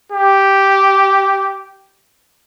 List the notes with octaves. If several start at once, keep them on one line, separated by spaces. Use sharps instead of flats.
G4